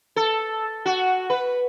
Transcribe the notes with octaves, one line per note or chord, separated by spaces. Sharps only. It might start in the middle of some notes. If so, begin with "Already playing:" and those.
A4
F#4
B4